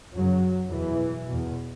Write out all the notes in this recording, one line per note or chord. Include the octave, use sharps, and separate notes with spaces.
F#2 C#3 F#3
E2 B2 E3
E2 B2